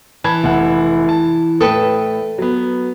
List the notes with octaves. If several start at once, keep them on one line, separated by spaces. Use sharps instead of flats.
E3 A5 B5 G#6
F1 F#5
A5
A2 A4 B4 G5 D#6
F#3 B3